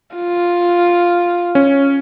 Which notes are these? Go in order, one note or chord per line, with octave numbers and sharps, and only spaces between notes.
F4
C#4